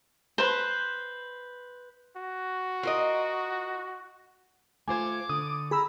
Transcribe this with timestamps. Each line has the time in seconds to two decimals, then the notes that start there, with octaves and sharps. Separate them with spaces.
0.38 B4 C5
2.17 F#4
2.83 F4 A#4 D#5
4.88 A3 F4 C5 G#5 D6 G#6
5.29 D3 D#6
5.71 G#4 A#5 B5 E6